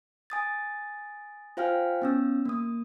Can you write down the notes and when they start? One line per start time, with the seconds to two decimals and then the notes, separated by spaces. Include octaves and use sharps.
0.30 G#5 D#6 A6
1.57 F4 C5 F5 G5 G#5 F6
2.02 B3 C#4 E6
2.46 A#3 D#6